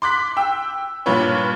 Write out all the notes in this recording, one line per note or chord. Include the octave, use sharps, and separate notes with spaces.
C6 D6 F#6 B6
G5 E6
G2 A#2 F4 B4 C#5